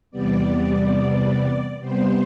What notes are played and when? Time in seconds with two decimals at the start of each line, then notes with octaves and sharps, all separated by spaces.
0.11 E2 C3 G3 B3 D5
1.80 C3 G3 B3 C5